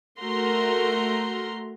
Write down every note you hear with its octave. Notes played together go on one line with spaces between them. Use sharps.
A3 F#4 A#4 A#5 C6